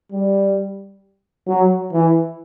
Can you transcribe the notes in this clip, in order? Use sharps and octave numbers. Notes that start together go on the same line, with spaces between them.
G3
F#3
E3